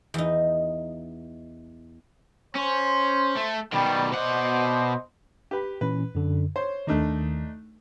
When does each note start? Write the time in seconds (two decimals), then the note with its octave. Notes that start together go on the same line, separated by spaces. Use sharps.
0.14 E2 D#4
2.56 C#4 C5
3.36 A3
3.73 B2 D#3 G3
4.12 B2 C5 D5 D#5 F#5
5.51 G4 B4
5.81 A#2 E3 C#4 B4
6.15 F#2 D3
6.56 C5 C#5
6.87 D#2 D#3 A3 D4 D#4